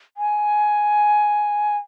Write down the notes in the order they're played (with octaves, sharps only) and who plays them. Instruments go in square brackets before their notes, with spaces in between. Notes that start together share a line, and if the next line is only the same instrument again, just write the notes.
[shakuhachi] G#5